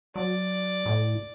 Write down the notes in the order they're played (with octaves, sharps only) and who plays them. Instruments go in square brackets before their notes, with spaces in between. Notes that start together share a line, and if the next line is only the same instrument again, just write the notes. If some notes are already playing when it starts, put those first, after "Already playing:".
[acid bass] F#3 [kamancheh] D5
[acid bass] A2